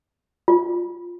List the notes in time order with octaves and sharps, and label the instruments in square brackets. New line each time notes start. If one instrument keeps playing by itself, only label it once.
[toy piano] F4